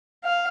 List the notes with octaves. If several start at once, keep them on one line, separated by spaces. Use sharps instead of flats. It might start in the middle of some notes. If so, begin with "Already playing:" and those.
F5